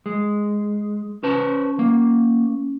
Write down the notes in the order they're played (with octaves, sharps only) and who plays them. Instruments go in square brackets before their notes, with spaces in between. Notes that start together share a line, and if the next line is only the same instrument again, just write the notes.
[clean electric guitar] G#3
[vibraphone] C#4 [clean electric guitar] B4 C5 A5
[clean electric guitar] A#3